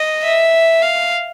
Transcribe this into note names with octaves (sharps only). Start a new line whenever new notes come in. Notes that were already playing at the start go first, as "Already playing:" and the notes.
Already playing: D#5
E5
F5